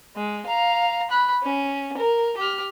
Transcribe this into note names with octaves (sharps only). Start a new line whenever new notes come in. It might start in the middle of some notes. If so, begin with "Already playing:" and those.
G#3
F5 A#5
B5 F#6
C#4
A#4
G4 F6